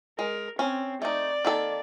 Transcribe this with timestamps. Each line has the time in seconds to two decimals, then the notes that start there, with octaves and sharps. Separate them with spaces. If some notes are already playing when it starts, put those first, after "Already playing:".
0.19 G#3 A#4
0.59 C4 C#4
1.02 A3 D#4 D5
1.45 D#3 A#3 A4